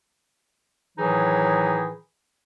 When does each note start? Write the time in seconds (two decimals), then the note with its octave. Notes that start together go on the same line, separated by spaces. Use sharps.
0.98 A2 D#3 E3 F#3 D#4 G#4